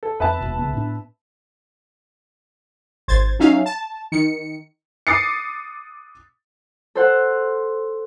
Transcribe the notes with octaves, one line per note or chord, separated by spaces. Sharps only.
A4
F2 C4 B4 E5 A5
D#1 A#1 B2
C#2 C#3 B3
A2 B3 D4
G#1 C5 G#6 A6
F#3 C#4 D#4 E5 F5
A5
D#3 C#7
D6 D#6 A6 C7 C#7
A4 C5 F#5